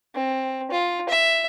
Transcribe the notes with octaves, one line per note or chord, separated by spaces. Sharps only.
C4
F4
E5